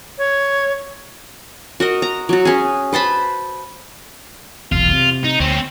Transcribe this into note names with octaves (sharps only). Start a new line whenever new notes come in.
C#5
F#4 A#4 D#5
A#5
F#3 F#4
C#4 G#4
B4 C5 A5 B5
F1 B1 E2 F4
C3
D#4
D2 C4 C#4